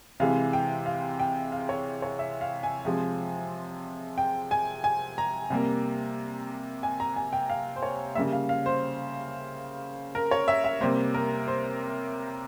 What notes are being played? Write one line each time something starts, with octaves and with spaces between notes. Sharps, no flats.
C3 E3 G#3 F5
G5
F5
G5
F5
C#5
C#5
E5
F5
G#5
C3 F3 G#3
G5
G#5
G#5
A#5
C3 G3 A#3
G#5
A#5
G#5
G5
F5
C5
C#5
C#3 G3 A#3 E5
F5
F5
C5
A#4
C#5
E5
E5
C3 G3 A#3 C5
A#4
C5